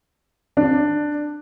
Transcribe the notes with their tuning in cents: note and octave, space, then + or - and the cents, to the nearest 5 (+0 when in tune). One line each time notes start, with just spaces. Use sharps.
D4 +10